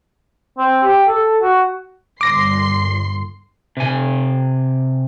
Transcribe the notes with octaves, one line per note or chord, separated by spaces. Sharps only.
C4
G4
A4
F#4
G1 C6 D6 A#6 C7
C3 G#5